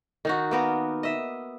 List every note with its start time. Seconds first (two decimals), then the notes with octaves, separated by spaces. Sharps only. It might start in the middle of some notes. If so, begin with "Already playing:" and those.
0.25 D#3 D#4 F#4
0.51 A#3 B3 A#4
1.03 D#5 E5